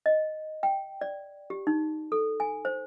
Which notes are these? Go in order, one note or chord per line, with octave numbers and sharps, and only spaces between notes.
D#5
G5
D5
G4
D#4
A4
G#5
C5